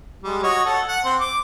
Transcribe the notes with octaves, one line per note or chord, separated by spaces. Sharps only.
G3 G#3
F#4 C#5 D#5
A4 F#5
F#5
C4 C5
D6